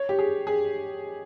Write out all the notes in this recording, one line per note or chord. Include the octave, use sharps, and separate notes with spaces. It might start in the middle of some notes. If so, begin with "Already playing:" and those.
Already playing: C#5
G4
G#4
G#4